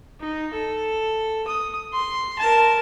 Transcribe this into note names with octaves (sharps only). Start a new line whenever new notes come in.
D#4
A4
D#6
C6
A#4 A5